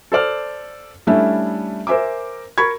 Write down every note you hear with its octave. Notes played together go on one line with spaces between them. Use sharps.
A4 C5 D5 F6
G3 A3 C#4 D4 E4 E5
A#4 C5 E5 G#5 D6
A#4 B5 C#6 G#6